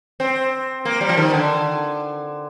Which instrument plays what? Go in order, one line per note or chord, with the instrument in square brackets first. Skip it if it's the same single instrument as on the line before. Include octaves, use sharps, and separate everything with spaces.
[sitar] C4
A#3
G3
F3
D#3
D3